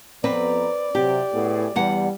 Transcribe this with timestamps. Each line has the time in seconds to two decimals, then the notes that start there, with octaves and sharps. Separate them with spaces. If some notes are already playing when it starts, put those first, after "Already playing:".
0.24 F2 B3 C4 B4 D5 A#5
0.95 C3 F#3 G4
1.32 A2 B3 G#4
1.76 E2 G3 F#5